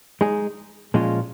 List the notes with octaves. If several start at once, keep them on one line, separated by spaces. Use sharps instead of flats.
G#3 D#4 G#4
A#2 F3 G#3 C#4 F4